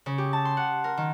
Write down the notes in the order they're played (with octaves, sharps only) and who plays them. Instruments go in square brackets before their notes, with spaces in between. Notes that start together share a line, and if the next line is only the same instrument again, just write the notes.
[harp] C#3
G4
A5
C6
F#5
A#4
D#3